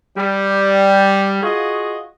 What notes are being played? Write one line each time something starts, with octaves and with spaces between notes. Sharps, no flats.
G3
F4 F#4 G#4 D#5